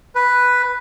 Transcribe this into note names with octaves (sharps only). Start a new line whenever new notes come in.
B4